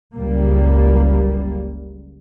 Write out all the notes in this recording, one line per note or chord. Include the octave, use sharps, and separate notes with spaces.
F#1 C#2 F#2 G3 A#3